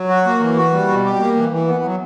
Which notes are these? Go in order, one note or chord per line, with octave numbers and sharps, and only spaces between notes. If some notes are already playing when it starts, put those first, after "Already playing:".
Already playing: F#3
F#4
A#3
E3
F#4
G3
B2
G4
A#3
E3
E3
B3
F#3